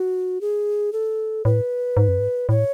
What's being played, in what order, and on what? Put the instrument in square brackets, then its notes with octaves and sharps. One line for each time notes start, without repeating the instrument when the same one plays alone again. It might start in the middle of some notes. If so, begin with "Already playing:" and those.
Already playing: [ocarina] F#4
G#4
A4
[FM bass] A2 [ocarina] B4
[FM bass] G#2
F#2
G#2
[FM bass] A2 [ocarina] C#5